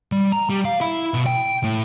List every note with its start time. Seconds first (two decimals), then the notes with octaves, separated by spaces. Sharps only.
0.12 G3
0.32 A#5
0.50 G3
0.65 F5
0.81 E4
1.14 B2
1.26 G5
1.64 A2